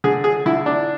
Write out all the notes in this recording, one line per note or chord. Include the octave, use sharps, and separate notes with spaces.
D3 G#4
G#4
D3 E4
D4